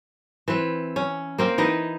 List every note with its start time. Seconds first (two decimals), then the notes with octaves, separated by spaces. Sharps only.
0.48 E3 C4 B4
0.96 C#4
1.38 A#3 C4
1.58 E3 D#4 B4 D#5